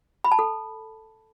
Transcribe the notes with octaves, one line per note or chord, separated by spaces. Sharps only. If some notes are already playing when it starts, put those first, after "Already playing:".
B5
A5
A4